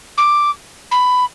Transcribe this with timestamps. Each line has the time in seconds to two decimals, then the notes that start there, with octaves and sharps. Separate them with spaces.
0.17 D6
0.91 B5